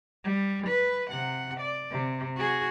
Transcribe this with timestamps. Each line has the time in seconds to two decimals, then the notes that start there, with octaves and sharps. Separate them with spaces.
0.24 G3
0.67 B4
1.10 C3 F#5
1.60 D5
1.91 C3
2.37 F#4 G#4